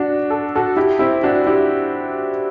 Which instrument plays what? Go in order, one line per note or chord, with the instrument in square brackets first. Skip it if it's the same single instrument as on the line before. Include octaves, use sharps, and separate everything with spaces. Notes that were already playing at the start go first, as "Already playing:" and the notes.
Already playing: [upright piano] D4 F#4
A4
F#4 A4
E4 G4
C4 E4
D4 F#4
E4 G4